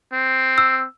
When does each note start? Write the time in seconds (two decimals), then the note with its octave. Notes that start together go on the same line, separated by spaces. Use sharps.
0.13 C4
0.58 E6